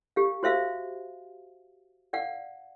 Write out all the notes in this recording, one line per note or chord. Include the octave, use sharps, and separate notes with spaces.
G4 F5
F#4 C5 E5 F5
D5 F5 F#5